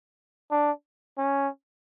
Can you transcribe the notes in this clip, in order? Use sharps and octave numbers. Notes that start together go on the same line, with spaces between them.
D4
C#4